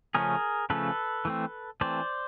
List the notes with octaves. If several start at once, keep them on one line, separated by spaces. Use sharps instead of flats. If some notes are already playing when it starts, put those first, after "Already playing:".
C#3 F3 A3 C#4 G#4 A#4
C#3 F3 A3 C#4 A4 B4
E3 A3 C4
E3 A3 C4 C5 D5